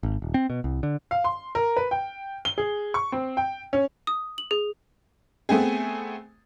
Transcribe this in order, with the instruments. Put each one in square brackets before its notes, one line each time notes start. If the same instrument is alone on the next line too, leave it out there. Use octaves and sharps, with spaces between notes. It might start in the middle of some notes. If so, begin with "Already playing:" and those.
[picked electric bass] G#1
D#1
C4
B2
C2
D3
[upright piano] F5
C6
A#4
B4
G5
G7
G#4
C#6
C4
G5
C#4
[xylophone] D#6
F#7
G#4
[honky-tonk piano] A3 B3 C4 G#4